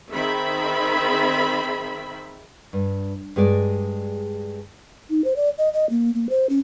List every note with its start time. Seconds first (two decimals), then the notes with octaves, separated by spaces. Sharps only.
0.12 D#3 C4 G#4 E5 B5
2.73 G2
3.36 G2 G#3 G#4 D5
5.10 D#4
5.24 C5
5.36 D5
5.58 D#5
5.73 D#5
5.90 A#3
6.14 A#3
6.30 C5
6.49 C#4